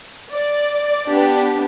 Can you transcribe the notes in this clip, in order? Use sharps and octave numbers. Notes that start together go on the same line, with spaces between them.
D5
B3 D4 G4